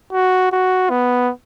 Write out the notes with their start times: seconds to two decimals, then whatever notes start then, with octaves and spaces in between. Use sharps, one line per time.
0.12 F#4
0.52 F#4
0.90 B3